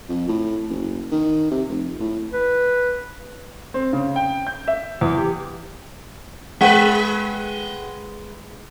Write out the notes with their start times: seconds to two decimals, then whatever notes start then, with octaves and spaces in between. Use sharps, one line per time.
0.09 F2
0.28 A2
0.69 F#1
1.12 D#3
1.51 C3
1.69 F1
2.00 A2
2.33 B4
3.74 C4
3.93 C#3
4.16 G5
4.47 G6
4.68 E5
5.01 E2
5.18 G4
6.61 G#3 G#4 B4 F#5 G5